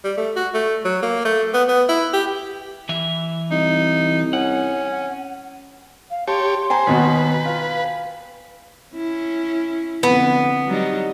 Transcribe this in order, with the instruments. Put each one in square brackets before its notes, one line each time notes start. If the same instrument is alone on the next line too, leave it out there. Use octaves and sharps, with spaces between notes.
[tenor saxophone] G3
A3
F#4
A3
F#3
A#3
A3
B3
B3
E4
G4
[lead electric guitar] E3 E5
[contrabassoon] C2 [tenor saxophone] D#4
[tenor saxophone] C#4 [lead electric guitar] F#5
[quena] F5
[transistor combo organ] G4 C#5 [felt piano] A5 [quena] C6
[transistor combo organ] C5 [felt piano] G5 G#5 A#5
[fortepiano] D#2 B2 F#4 [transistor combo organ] B4
[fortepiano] F4
[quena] F5
[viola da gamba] C#4 E4
[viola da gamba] F2 D3 [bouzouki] B3
[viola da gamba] F#3 G3 D#4